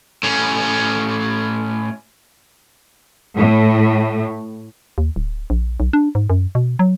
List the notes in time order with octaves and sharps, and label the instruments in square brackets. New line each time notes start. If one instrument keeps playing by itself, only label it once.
[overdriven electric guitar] A2 C#4
[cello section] A2
[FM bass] D#2
D1
A#1
B1
D4
G#2
F#2
B2
F#3